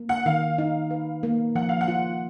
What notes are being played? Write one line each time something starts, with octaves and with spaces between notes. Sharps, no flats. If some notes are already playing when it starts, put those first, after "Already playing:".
Already playing: A#3
F#5
D#3 F5
D#4
B4
A#3
F3 F#5
F5
F#5
F4